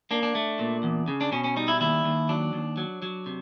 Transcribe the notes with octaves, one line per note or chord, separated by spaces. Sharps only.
A#3 D4
D4
A3
A#2
E2
C#3
D4
B2 C#4
C#4
G3 D#4
E4
D#2 E4
D#2
F#3 D4
D#2
F#3
F#3
C3